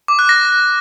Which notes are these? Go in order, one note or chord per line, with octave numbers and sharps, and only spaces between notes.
D6
F#6
A#6